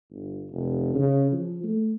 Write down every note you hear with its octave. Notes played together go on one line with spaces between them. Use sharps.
G1
F1
C#3
F3
A3